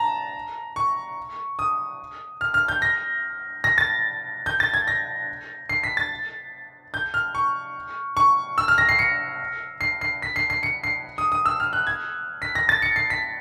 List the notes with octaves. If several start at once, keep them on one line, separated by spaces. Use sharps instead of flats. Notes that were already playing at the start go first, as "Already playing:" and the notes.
Already playing: A5 A#5
C#6
D#6
F6
F6
G6
A#6
A#6
A6
G6
A6
G#6
A#6
C7
B6
A6
G6
F6
C#6
C#6
E6
F6
A#6
C7
C#7
C7
C7
B6
C7
C7
C#7
C7
D#6
D#6
E6
F6
F#6
G#6
B6
A#6
A6
C#7
C7
B6